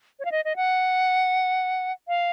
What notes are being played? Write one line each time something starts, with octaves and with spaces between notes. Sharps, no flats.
C#5
F5
D#5
D#5
F#5
F5